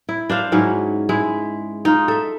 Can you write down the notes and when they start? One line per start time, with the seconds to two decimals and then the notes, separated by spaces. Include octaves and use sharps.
0.09 E4
0.30 D4 C5 F5
0.52 G#2 F#3 C#4 E4
1.09 G#3 E4
1.85 D#4 F4
2.08 A4 E5